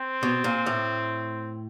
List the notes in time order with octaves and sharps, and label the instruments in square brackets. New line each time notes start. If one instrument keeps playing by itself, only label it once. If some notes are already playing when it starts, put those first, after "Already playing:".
Already playing: [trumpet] C4
[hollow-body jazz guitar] B2
A#2
A2